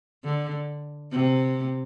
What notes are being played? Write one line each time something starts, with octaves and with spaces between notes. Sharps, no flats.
D3
C3